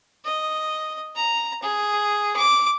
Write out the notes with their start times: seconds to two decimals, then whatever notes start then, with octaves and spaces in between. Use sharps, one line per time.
0.25 D#5
1.15 A#5
1.62 G#4
2.36 D6